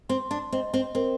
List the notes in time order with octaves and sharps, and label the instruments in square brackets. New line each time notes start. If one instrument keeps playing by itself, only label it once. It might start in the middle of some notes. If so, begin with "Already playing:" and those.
[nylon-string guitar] C4 [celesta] C6
[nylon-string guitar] D4
[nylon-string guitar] C4 [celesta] D#5
[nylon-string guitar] C4
[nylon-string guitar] C4 [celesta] A#4